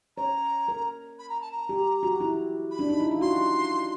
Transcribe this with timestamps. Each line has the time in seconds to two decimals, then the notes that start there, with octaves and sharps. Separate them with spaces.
0.17 C#5 A#5
0.68 A#4
1.19 B5
1.29 A#5
1.41 A5
1.52 A#5
1.69 G4
2.03 F#4
2.20 E4
2.71 B5
2.79 D4
2.90 D#4
3.00 E4
3.11 F4
3.21 F#4 C6